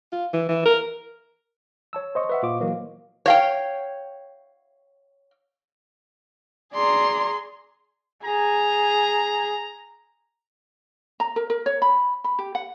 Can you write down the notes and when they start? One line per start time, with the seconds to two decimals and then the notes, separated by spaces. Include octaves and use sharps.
0.12 F4
0.33 E3
0.49 E3
0.65 A#4
1.93 C#5 A5 E6
2.15 C5 D#5 C#6
2.29 B4 E5 F#5
2.43 A#2 F4 D6
2.60 E3 F#3 A#3
3.26 C#5 F5 G5
6.74 G#4 D5 A#5 C6
8.24 G#4 A#5
11.20 A#5
11.36 A#4
11.50 A#4
11.66 C#5
11.82 B5
12.24 B5
12.39 G4
12.55 F#5